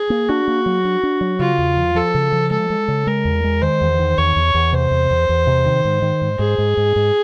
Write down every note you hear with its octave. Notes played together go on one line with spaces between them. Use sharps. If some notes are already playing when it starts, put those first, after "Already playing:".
Already playing: G#4
A#3
D4 F#4
A#3
F#3
D4
D4
F#3
C#3 F4
E2
F3
F3 A4
C#3
F3
G#3 A4
G#3
C#3
G#3 A#4
E2
G#3
D#3 C5
E2
D#3
E2 C#5
E2
E2
C3 C5
E2
E2
E2
C3
D#3
G#2
D#3
G#2
G#2 G#4
G#2
G#2
G#2